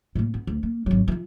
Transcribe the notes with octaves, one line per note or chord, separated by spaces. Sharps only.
A2 A#3
B3
D2
A#3
G#1 F#3
E3 F3